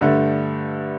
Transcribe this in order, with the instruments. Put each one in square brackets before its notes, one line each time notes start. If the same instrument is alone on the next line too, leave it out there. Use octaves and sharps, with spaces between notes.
[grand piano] G2 D3 A3